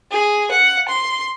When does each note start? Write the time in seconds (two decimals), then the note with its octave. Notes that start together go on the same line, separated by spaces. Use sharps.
0.11 G#4
0.52 F#5
0.89 C6